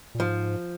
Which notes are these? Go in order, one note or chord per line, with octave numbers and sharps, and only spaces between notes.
A#2
G#2 F3